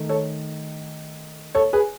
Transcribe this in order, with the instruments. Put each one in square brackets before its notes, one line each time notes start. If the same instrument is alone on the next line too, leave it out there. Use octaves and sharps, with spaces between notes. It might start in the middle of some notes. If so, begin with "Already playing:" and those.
Already playing: [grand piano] D#3 A3
A4 C#5
A4 C#5
G#4 B4